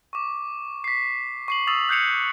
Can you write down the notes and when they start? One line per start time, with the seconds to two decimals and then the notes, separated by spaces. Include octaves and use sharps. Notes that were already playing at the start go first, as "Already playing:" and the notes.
0.13 C#6 D6
0.84 B6 C7
1.48 C#6 C7 F#7
1.67 C#6 D#6 E6 A6 F7 F#7
1.89 F#6 G6 C7 C#7 F7